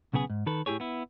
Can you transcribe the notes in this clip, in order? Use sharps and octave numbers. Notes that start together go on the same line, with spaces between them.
B1 C#3 B3 G#4
G#2
D#3 A4 B4
A2 E4 G4 G#4 C#5
B3 E4